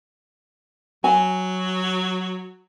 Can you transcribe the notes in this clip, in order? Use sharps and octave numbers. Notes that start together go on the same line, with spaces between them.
F#3 G#5